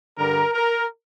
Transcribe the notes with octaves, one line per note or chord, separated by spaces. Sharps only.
G2 D3 G3 A#4
A#4